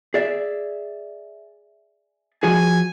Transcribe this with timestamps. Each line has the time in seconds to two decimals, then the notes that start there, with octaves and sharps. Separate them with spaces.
0.14 G#4 D5 E5
2.43 F3 F#4 G#4 G#5